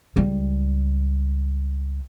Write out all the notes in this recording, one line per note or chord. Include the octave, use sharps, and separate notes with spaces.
C#2 G3